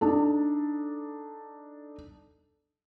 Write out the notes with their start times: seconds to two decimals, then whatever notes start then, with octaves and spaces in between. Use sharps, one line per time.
0.01 D4 D#4 A4